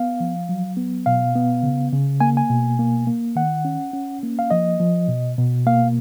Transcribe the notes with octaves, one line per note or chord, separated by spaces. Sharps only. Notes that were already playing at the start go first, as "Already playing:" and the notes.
Already playing: B3 F5
F3
F#3
B3
B2 F5
B3
C#3
C#3
A#3 G#5
G#5
B2
A#3
A#3
D#3 F#5
C#4
C#4
A#3
F5
F3 D#5
F3
B2
B2
A#3 F5